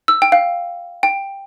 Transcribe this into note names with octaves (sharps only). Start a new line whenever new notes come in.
E6
G5
F5
G5